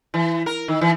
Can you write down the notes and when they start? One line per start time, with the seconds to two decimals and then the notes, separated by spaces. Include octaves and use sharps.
0.14 E3
0.46 A#4
0.68 D#3
0.81 E3